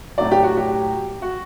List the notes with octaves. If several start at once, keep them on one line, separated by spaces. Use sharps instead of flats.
A2 F#3 D5
G4
F#4
G4
F#4